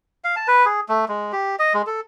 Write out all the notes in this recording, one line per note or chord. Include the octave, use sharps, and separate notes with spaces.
F5
A5
B4
G#4
A3
G#3
G4
D#5
G#3
A4